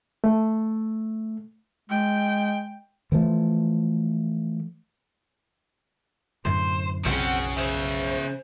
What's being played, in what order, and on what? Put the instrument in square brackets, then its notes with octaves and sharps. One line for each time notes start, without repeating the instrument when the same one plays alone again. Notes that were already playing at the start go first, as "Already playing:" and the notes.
[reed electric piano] A3
[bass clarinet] G#3 [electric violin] G5
[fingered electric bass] E3 F3 A3
[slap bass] F#2 A2 D3 [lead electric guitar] C5
[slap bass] F#1 B1 F3 [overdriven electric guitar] C#3 C#4 [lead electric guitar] C4 [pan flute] F#5
[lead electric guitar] G#4 E5 [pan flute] C5